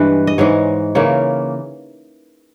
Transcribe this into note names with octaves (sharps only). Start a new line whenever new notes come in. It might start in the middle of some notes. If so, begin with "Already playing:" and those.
Already playing: G2 E3 G#3 B4
D#5
G#2 E3 G#3 C#5
C#3 E3 A#3 C#5